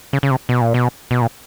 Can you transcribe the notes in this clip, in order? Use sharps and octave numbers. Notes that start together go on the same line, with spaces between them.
C#3
C#3
C3
B2
A#2
B2
B2
A#2